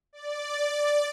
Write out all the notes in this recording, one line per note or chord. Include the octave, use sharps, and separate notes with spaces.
D5